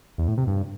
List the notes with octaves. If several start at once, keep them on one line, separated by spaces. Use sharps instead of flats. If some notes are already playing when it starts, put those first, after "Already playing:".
E2
A2
C3
G2